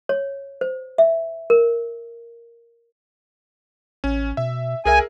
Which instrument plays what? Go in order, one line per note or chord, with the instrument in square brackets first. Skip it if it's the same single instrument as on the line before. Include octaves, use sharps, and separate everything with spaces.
[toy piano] C#5
C5
E5
A#4
[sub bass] A1 [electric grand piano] C#4
[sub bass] B2 [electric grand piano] E5
[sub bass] C2 [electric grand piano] G#4 A#4 E5 [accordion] G#5